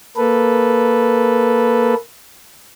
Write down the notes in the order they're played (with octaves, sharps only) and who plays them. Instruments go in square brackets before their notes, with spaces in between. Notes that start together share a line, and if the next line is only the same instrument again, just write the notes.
[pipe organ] A#3 A4 B4